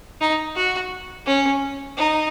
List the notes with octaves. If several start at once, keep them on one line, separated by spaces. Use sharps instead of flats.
D#4
F#4
C#4
D#4